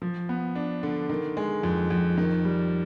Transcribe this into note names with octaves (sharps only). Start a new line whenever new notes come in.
F3
B3
D4
D3
D#3
G#3
F2
F2
D#3
G3